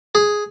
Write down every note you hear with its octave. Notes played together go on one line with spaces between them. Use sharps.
G#4